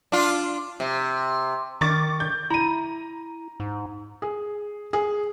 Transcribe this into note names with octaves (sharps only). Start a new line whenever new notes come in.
D4 F4
C3
D#3 C#6 D6 A6
G6
E4 A#5 D#7
G#2
G#4
G#4